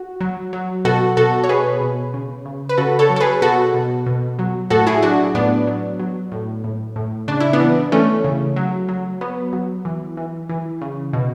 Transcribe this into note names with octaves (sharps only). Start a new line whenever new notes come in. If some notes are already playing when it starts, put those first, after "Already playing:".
Already playing: F#4
F#3
F#3
B2 F#4 A4
B2 F#4 A4
C#5
B2 G#4 B4
B2
C#3
C#3
B4
C#3 F#4 A4
A4 C#5
F#3
A4
G#4 B4
B2 F#4 A4
B2
B2
F#3
A2 F#4 A4
E4 G#4
F#3 D4 F#4
A2 B3 D4
F#3
F#3
A2
A2
A2
C#3 D4
E4
B3 D4
E3
E3 A3 C#4
C#3
F#3
F#3
F#3 B3
F#3
E3
E3
E3
C#3
B2